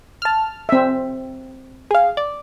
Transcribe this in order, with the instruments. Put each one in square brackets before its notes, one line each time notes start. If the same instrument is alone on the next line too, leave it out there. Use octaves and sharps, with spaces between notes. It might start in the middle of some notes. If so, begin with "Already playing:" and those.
[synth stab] A5 F6
[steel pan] C4 E5
[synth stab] G#4 F5
D5